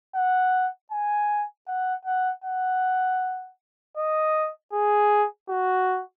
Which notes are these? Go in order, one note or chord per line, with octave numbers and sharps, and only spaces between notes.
F#5
G#5
F#5
F#5
F#5
D#5
G#4
F#4